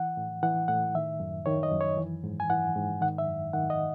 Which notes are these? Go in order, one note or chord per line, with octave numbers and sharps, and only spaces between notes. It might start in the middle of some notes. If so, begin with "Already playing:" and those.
Already playing: E3 F#5
A2
E3 F#5
A2 F#5
D#3 E5
F#2
D#3 C#5
D#5
F#2
C#5
E3
G#2
G#5
E3 F#5
G#2
D#3 F#5
E5
F#2
D#3 F#5
D#5